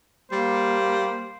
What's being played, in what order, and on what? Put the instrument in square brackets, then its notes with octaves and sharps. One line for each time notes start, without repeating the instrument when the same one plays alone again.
[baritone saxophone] G3 [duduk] A#3 [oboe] C5